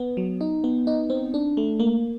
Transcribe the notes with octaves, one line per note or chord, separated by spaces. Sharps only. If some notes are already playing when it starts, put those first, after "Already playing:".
Already playing: B3
F#3
D#4
B3
D#4
C4
D4
A3
A#3